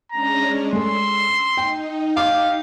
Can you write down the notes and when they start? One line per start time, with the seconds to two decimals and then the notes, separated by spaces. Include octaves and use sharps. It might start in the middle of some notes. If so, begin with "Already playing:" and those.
0.12 G#3 C#4 D4 A#5
0.73 G#3 A4 C6 E6
1.57 D#4 G5
2.17 G4 F5 D6